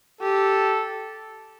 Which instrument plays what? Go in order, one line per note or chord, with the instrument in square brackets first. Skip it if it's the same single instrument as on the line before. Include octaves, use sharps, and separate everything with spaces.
[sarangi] G4 [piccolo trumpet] A4